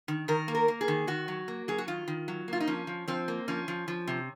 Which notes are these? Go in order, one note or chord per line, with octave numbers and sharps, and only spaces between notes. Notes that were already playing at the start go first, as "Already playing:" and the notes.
D#3
D#3 A#4
A#3
A#4
A#3
G#4
D#3
D#3 F#4
F#3
A#3
F#3 G#4
F#4
D#3 F4
D#3
F#3
A#3 F4
D#4
F3 C#4
F3
F3 C4
A#3
F3 C#4
F3
F3
C3